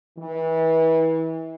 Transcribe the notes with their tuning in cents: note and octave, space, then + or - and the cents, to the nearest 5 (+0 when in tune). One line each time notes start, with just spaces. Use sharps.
E3 -30